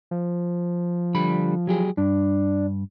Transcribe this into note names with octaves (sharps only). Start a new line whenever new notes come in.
F3
D3 G3 B5
F#3 G4 G#4
G2 D4